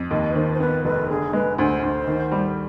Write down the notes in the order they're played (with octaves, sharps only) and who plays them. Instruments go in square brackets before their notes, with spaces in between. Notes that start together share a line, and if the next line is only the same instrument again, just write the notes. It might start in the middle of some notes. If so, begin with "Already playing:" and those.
Already playing: [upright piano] F2
[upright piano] D#2 [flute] D#5
[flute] B4
[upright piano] D#3 [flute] C5
[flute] C5
[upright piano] B3 [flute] B4
[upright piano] F1 [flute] B4
[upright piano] D3 [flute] G#4
[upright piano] G#3 [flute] B4
[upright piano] D2 [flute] C5
[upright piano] D2
D#3
G3